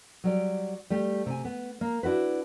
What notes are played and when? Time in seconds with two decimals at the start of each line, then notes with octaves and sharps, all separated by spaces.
0.24 F#3 G3 D5
0.90 G3 A3 G4
1.26 C3 G#5
1.45 B3
1.81 A#3
2.03 D4 E4 F#4 B4